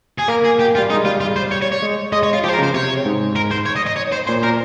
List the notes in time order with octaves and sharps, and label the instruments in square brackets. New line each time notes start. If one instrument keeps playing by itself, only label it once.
[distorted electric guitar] G#4
[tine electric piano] A#3 [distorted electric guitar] A#4
[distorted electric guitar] G#4
G4
F4
[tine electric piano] G3
[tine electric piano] G#3 [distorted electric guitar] D#4
[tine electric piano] G3 [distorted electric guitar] F4
[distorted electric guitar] F4
C5
C#5
C#5
C#5
[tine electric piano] G#3
[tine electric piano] G#3 [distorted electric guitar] D#5
[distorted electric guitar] C#5
F4
[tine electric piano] F3 [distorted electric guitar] G4
[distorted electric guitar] C5
A#4
[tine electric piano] C#3
[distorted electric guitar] C5
[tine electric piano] C3 [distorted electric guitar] C#5
[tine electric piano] G#2
[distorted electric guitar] A#4
C5
C#5
D#5
D#5
C#5
C5
[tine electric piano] A#2 [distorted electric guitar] C5
[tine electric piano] A#2 [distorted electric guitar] A#4